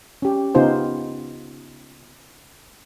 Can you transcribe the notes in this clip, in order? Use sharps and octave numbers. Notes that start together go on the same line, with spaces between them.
C#4 G4
C#3 B3 D#4 F4 G4 C5